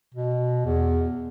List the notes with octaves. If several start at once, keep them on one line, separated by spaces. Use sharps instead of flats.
B2
E2